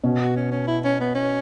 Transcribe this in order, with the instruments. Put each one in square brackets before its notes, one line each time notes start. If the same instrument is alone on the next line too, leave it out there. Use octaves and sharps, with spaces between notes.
[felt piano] B2 [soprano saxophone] C#4
[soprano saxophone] F#4
C#4
C#4
E4
C#4
B3
C#4